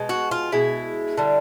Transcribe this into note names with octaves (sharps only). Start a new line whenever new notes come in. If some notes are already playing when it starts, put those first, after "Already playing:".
Already playing: B2 G#3
F#4
F4
B2 G#3 E4
D3 G3